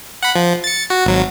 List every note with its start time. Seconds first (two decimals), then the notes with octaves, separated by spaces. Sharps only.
0.23 F#5 B5
0.35 F3
0.64 A6 C#7
0.90 F#4
1.06 G#1 F#3